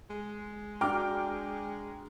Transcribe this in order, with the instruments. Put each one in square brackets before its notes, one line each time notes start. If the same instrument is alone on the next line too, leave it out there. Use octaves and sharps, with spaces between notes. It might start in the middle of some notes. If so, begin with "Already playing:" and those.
[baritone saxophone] G#3
[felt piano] D4 F#4 A#5 [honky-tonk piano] G5 D6 F6